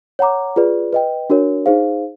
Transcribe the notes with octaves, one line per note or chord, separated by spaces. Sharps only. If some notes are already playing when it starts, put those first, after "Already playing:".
C#5 F#5 A#5 D6
F4 G#4 B4 D5
B4 D#5 G5
D4 F#4 A#4 C#5
D#4 G#4 C5 F5